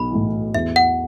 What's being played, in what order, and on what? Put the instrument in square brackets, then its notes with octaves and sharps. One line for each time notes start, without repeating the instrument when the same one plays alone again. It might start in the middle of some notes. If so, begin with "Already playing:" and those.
Already playing: [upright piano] B1 [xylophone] B5
[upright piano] A2 E3
[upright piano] E2 [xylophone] E5
[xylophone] F#5